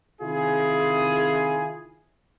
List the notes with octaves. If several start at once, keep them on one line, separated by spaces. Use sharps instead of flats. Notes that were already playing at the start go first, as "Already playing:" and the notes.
C3 D#3 E4 F4 G#4